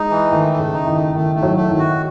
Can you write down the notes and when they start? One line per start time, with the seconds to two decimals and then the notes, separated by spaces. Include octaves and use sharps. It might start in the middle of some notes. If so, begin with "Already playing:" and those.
Already playing: G#3 D#4
0.10 E3
0.31 D#3 A3
0.52 A3
0.59 C#3
0.73 D#4
0.87 D#3
0.95 A3
1.15 D#3 A3
1.36 A3
1.43 F#3
1.57 A3
1.71 D#3
1.79 F#4